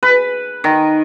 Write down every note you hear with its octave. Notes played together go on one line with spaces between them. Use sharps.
B4
D#3